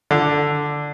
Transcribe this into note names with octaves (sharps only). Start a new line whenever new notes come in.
D3